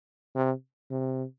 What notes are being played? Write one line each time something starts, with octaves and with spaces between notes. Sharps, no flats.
C3
C3